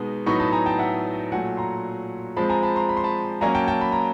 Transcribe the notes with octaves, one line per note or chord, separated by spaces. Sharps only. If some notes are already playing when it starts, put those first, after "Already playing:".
Already playing: B2 G#3 B3 D#4
A2 F#3 B3 D#4 B5 C#6
A5 B5
G#5 A#5
G5 A5
E5 F#5
A#2 F#3 A3 F#5 G#5
A#5 C6
F3 G#3 C4 A5 B5
G#5 A#5
A5 B5
A#5 C6
B5
C6
A5 B5
F#3 A#3 C#4 G#5 A#5
G5 A5
G5 A5
B5
A#5